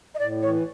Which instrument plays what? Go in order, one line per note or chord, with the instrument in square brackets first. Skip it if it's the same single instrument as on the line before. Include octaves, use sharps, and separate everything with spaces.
[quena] D#5
[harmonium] A2 [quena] D5
[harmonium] E3 [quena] C#5